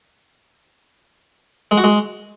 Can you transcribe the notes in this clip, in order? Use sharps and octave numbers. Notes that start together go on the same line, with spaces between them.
G#3
F#4
G#3